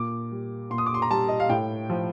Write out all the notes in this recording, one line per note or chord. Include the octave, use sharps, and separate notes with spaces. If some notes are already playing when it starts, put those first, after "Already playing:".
Already playing: A#2 D6
G3
A#2 C6
D#6
D6
C6
A#5
G3 A5
D#5
F5
A2 G5
F3